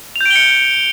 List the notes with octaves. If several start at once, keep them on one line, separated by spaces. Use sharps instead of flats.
G6 C#7 D7 F7 G7